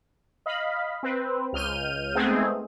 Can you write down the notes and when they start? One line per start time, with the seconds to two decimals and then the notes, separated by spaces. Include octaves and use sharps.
0.46 D#5 F5 B5
1.03 C4 B4
1.53 C#2 F6 G6 D#7
2.15 G#3 A3 B3 C4 D#4 G#4